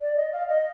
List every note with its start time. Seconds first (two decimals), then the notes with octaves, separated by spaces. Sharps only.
0.01 D5
0.16 D#5
0.32 F5
0.48 D#5